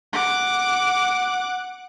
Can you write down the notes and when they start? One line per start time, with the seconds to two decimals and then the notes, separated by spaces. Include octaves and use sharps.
0.13 F#5 D6